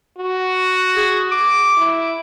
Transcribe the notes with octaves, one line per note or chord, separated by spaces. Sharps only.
F#4
G#4
D6
E4